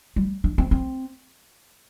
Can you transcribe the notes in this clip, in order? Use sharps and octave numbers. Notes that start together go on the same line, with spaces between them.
G3
D4
C4
C4